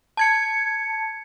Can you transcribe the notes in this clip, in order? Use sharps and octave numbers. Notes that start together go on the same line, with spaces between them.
A5 G#6 C#7